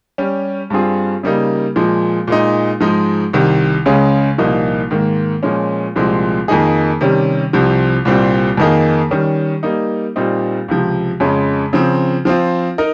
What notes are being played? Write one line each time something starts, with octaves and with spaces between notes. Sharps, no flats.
G3 C#4 G4
G2 G3 C4 F4 G#4
C#3 G3 A#3 D#4
A#2 F3 G#3
A#2 G#3 D#4
G#2 F3 G#3 D#4
C2 C3 D#3
C#2 C#3 G#3 C#4 G#4
C2 A#2 F3 A#3 D#4
G#2 D#3 A#3
A#2 F3 G#3 C#4
C2 A#2 F3 G#3 C4
F2 D#3 A#3 D#4 G#4
C3 D#3 G3 C#4
C2 C3 F3 C4
C2 A#2 G3 C4
F2 D#3 A#3 D#4 G#4
D#3 G3 C#4
G3 A#3 D#4
A#2 G3 C4 D#4
C#2 C3 F3
F2 C#3 G#3 C#4
C#3 F3 C4
F3 C4 F4
D#4 A#4